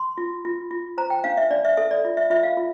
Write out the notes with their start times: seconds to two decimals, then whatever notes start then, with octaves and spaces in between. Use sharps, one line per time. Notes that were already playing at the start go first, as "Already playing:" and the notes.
Already playing: C6
0.18 F4
0.45 F4
0.71 F4
0.98 C5 A#5
1.10 G5
1.24 D4 F5
1.37 E5
1.51 D4 D5
1.65 E5
1.77 A4 E5
1.91 D5
2.05 F4
2.17 E5
2.30 F4 E5
2.43 F5
2.57 F4